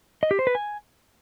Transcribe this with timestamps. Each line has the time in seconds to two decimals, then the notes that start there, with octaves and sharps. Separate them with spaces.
0.23 D#5
0.31 G4
0.39 C5
0.47 B4
0.55 G#5